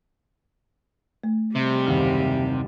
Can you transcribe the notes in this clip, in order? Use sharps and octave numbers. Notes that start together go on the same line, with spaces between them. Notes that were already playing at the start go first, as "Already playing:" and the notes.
A3
C3 G3 G#3 G4
F#1 D#2 F6